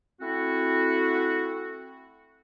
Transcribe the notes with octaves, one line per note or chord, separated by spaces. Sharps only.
A3 C4 E4 F#4